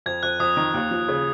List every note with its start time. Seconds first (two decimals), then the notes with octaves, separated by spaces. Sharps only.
0.06 F2 G#6
0.23 F2 F#6
0.40 F2 D#6
0.57 D#3
0.74 D#2
0.91 F3
1.08 C#3